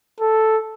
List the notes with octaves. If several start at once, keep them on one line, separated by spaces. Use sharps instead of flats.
A4